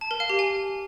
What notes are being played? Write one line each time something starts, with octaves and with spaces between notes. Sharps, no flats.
A5
A#4
F5
G4
G#5